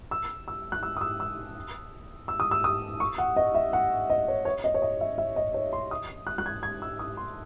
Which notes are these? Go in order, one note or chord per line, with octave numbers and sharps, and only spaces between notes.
E6
E6
F#6
E6
D#6
E6
E6
E6
D#6
E6
D#6
C#6
F#5
D#5
E5
F#5
D#5
C#5
C#5
D#5
C#5
D#5
E5
E5
D#5
C#5
C6
D#6
F#6
F#6
G#6
G#6
E6
D#6
C6